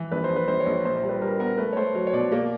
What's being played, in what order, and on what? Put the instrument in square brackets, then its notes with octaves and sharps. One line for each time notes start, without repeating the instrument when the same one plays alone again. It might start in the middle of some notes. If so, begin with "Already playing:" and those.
Already playing: [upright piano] E3
[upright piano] A#1 [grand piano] B4
[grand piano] C5
[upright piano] A#1
[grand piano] B4
[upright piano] A#1 [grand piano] C5
[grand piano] C#5
[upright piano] A#1
[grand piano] C#5
[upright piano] A#2 [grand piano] C5
[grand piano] C5
[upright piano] G3
[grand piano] B4
[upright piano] G3 [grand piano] A#4
[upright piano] B3 [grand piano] A#4
[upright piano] A3 [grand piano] B4
[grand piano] C#5
[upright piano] A3 [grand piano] C5
[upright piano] F#3 [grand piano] C#5
[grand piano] C#5
[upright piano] B2 [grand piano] D5
[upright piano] A#3 [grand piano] D5